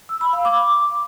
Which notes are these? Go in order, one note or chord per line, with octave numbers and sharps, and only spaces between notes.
E6
B5
F5
D6